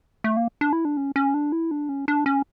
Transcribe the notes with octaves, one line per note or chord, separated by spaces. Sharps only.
A3
A#3
D4
E4
D4
C#4
C#4
D4
E4
D4
C#4
D4
C#4